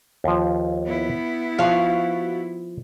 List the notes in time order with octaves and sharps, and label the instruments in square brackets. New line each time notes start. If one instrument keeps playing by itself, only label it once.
[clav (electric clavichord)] D#2 F3
[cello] B3 E4
[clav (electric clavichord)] F3 [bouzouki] F#4 F5